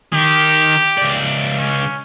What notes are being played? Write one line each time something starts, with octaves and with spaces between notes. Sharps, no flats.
D#3 G4
C#2 D5
C#4